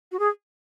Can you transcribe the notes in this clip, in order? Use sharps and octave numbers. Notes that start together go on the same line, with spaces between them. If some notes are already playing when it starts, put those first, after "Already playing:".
F#4
G#4